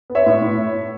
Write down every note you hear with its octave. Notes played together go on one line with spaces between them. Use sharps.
B3
C#5 E5
A2
A2